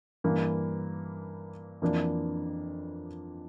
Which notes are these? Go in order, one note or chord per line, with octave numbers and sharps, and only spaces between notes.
G2 E3 A#3
F2 E3 A#3 D4